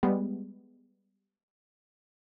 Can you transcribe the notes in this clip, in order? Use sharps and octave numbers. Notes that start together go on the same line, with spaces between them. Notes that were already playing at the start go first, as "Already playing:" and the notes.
G3 G#3 B3